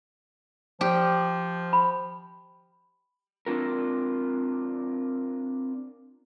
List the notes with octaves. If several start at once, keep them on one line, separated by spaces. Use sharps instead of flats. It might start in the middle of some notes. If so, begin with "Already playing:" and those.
F3 G4
B5
C4 D4 F4 A#4